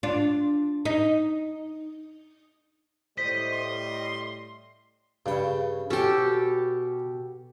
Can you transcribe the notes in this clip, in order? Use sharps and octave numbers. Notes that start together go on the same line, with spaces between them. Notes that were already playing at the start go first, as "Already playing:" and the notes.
D4 F4
D#4
A2 G3 C5 D#5 B6
C6
G2 C#3 F5 G5 B5
B2 C#4 F#4 G4 A4 C6